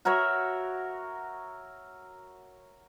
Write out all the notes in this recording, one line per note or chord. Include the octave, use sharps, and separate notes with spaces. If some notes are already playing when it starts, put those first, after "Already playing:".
F#4 A#4 C#5 E5